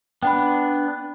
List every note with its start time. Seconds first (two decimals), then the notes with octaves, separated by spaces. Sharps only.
0.22 B3 D4 G5 B5